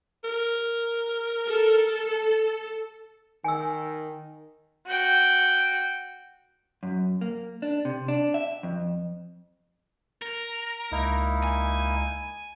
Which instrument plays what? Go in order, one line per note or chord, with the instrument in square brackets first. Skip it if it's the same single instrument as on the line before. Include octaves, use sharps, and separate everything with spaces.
[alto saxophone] A#4
[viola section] A4
[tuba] D#3 [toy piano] G#5 E6
[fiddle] F#4 G5
[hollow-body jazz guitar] F#2
A#3
D4
C3
D4
E5
F2
[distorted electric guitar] A#4
[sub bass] C#2 [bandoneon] A#3 D#4 E4
[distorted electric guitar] G#5